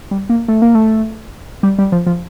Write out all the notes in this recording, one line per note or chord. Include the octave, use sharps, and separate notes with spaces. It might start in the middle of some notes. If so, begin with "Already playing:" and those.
G3
A#3
A3
A#3
A3
G3
G3
F3
F3